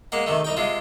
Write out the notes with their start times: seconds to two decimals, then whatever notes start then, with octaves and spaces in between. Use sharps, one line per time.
0.12 G#3 A#3 F#5
0.26 C3 D#3 A3
0.45 C2 D#4 G5
0.57 C3 G#3 F4